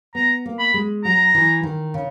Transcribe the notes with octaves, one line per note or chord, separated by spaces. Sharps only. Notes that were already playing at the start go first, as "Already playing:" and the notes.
B3 A#5
A#3
B5
G#3
F#3 A#5
E3
D#3
C#3